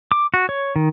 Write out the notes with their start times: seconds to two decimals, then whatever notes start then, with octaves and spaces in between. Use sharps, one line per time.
0.12 D6
0.34 F#4
0.49 C#5
0.76 D#3